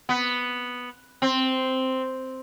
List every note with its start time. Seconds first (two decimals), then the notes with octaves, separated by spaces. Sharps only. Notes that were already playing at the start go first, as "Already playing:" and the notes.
0.09 B3
1.22 C4